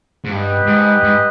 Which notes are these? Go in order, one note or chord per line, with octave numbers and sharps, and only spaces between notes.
G#2
G2 B3 G4 B4 D#5
G#2
G#2